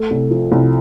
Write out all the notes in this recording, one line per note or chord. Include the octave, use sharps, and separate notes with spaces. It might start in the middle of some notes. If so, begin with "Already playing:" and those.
Already playing: A3
C2
F3
C2